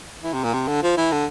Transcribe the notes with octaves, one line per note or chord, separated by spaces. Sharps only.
E3
C3
A#2
C3
D3
F3
E3
D3